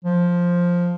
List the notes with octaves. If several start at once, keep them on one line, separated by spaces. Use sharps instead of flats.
F3